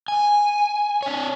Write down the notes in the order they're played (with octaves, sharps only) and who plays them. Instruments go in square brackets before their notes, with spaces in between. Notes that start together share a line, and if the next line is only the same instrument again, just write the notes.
[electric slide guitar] G#5
D4 C#5